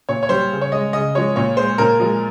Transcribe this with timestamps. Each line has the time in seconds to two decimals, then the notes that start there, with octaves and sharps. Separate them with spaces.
0.09 A#2 C#5
0.23 C#5
0.29 G3 C5
0.51 C#3
0.61 C#5
0.72 G#3 D#5
0.93 C#3 D#5
1.15 F3 G#3 C#5
1.36 A#2 C#5
1.57 G#3 C5
1.78 A#2 A#4
2.00 F3 G#3